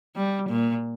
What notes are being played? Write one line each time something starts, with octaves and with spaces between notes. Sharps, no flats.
G3
A#2